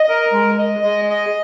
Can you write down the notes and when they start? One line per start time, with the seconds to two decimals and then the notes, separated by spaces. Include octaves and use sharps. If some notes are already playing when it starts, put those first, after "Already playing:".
Already playing: D#5
0.09 A#4
0.33 G#3
0.58 D#5
0.83 G#3
1.10 D#5